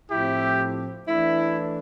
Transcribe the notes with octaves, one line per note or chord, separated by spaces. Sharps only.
A2 F3 C4 E4 G4
E3 A3 D4 E4